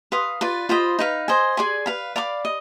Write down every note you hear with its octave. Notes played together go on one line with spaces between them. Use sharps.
B4 F5 C6 D#6
F4 B4 D5
F4 C5 D#5 B5
D#4 B4 F5
C5 D#5 G#5
G#4 D5 G#5 C6
B4 F5 B5
D5 F5 B5 D6
D#5